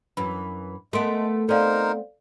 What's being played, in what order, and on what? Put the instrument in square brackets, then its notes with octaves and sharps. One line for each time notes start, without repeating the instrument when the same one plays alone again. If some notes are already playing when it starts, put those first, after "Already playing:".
[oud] F#2 E3 [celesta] B5
[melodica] G#3 [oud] A3 B3 [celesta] A#4 C6 D7
[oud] B3 C4 [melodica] D#4 A#4 C5 [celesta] A4 D5 F5